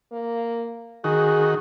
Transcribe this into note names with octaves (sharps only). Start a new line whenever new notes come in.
A#3
D#3 F#4 G#4